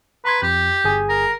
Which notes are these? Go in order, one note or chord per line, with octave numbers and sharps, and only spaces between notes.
B4 A#5 C6 G#6
F2 G4
G1 G#4 G#5
A#4